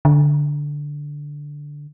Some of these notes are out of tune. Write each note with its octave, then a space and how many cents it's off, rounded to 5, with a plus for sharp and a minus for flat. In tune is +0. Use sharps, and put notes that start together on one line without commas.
D3 -5